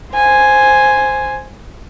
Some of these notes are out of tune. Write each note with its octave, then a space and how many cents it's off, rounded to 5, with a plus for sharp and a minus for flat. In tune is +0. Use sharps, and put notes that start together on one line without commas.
C5 +0 G#5 +0